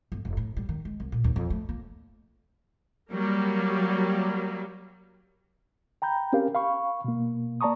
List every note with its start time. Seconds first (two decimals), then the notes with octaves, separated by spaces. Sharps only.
0.12 G1
0.25 F1
0.37 A2
0.57 G3
0.69 D#3
0.85 G#3
1.00 C2
1.12 A#2
1.24 D#2
1.36 F2
1.50 A3
1.69 A#3
3.10 F#3 G3 A#3
6.02 G5 A#5 B5 G6
6.33 C4 C#4 G4 A#4 F5
6.55 F5 B5 C#6
7.04 B2 A#3
7.61 A#3 D5 A5 A#5 C#6 D#6